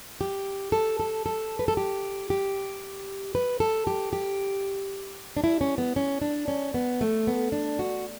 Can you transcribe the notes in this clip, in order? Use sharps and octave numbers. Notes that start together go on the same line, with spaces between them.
G4
A4
A4
A4
B4
A4
G4
G4
B4
A4
G4
G4
D4
E4
C#4
B3
C#4
D4
C#4
B3
A3
B3
D4
F#4